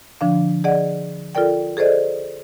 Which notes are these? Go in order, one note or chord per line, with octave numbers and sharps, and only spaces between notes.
D3 F3 D4 F5
G#4 D5 D#5 F#5
F4 A4 A#4 D5 G5
G#4 A4 C5 D5 D#5